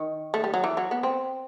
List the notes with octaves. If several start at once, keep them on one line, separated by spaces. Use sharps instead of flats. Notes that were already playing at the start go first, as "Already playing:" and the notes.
Already playing: D#3
A3
G3
F#3
E3
F#3
B3
C4